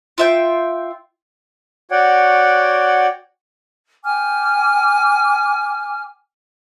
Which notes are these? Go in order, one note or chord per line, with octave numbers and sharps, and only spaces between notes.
F4 E5 G5
F#4 C#5 D5 F#5 G5
G5 G#5 D6 F6